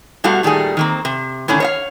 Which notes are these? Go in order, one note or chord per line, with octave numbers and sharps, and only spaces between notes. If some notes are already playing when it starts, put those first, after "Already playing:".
B2 G3 A3 F#4 F5
A#2 D#3 G3 A3 G#4
D#3 A#3 C4
C3
A2 D3 D#3 C#4
C#5 D#5 F5